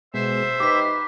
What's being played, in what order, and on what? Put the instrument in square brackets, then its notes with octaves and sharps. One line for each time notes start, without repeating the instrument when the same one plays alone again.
[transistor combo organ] B2 G#3 [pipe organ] C5 E5
[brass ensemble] D#4 B4 [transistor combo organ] G4 [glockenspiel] D6 B6